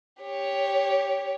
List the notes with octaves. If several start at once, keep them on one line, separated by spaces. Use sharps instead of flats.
G4 C#5